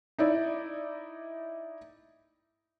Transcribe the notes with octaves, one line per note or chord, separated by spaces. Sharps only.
D#4 E4 D5